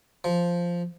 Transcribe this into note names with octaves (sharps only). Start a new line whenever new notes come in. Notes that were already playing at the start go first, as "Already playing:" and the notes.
F3